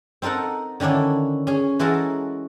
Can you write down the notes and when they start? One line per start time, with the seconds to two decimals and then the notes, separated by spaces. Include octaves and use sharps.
0.22 C4 D#4 A4 A#4 F#5
0.80 D3 D#3 C#4 D4 E4
1.47 C#4 G#4
1.79 E3 G#3 F#4 A4 A#4 A5